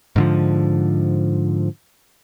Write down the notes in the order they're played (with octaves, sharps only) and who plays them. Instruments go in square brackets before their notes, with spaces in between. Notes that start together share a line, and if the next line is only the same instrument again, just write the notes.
[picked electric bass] G#2 D3 F3